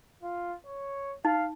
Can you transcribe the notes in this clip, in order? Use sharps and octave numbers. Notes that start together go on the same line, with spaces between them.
F4
C#5
D#4 F5